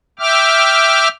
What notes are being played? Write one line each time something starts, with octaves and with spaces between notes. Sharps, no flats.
E5 G5 D6 F6